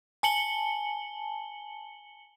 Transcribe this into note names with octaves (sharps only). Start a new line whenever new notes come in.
G#5 A5 C#7 F#7 G7